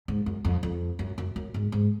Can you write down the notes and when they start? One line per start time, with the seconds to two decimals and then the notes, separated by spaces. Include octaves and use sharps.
0.08 G#2
0.26 F#2
0.45 F2
0.63 F2
0.99 F#2
1.18 F#2
1.36 F#2
1.54 G#2
1.72 G#2